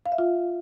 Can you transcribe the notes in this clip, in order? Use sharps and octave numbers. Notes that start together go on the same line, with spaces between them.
F5
E5
F4